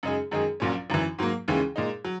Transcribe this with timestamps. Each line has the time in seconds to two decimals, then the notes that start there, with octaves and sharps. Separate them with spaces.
0.03 F#2 C#3 G#3 D#4 G#4
0.31 F#2 D#3 G#3 D#4 G#4
0.60 A#1 A#2 F#3 C#4
0.90 G#1 F#2 E3
1.19 G#2 F#3 A#3
1.48 D#2 C#3 E3 G#3 C#4
1.76 A#2 G#3 D#4
2.05 F#3